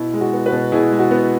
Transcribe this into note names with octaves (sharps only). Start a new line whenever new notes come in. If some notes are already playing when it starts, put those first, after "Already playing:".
Already playing: B2 E4
G#3
F#4
B3
F#4 B4
B2
B2 E4 G#4
G#3
F#4
B3